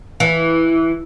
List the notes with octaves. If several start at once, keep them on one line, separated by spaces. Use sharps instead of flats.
E3